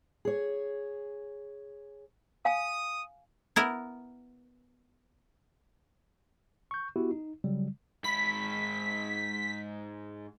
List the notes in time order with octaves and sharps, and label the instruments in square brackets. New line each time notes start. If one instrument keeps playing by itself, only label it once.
[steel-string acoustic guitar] G#4 C#5
[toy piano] F5 G#5 [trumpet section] D#6
[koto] B3 E4 A#4
[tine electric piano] C#6 G6
B3 E4 F#4 G4
D#4
C#3 F#3 G3
[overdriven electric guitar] G#2 B5 [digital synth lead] B6